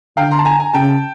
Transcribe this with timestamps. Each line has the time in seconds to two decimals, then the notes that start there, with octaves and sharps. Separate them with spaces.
0.17 D3 F5 G5
0.31 A#5 C6
0.39 A5
0.45 G#5 A#5
0.60 G#5 A#5
0.73 C#3 G5 A5